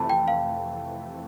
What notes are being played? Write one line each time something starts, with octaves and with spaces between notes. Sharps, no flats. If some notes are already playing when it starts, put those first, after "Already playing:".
Already playing: F2 C3 E3 A3 A5 B5
G5
F5